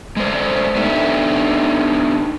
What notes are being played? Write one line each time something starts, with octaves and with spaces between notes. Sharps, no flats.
G#3 A3 C5 D5
B3 D4 D#4 G4 A4 E5